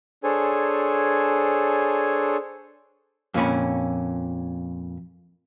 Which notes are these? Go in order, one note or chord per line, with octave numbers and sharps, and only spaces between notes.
D4 G#4 A4 C5 C#5 G#5
F2 A#2 C#4 B5